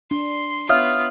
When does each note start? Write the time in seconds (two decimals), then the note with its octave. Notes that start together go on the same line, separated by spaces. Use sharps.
0.11 D4 C6
0.69 B3 F4 C#5 E5 F5 D#6 F6